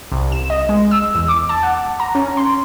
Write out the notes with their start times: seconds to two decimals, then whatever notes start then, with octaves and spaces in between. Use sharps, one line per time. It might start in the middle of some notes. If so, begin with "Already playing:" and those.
0.12 C2
0.32 E7
0.50 D#5
0.69 G#3
0.91 E6
1.15 E2
1.28 D6
1.49 A5
1.63 F#5
2.00 A#5
2.15 C#4
2.37 C6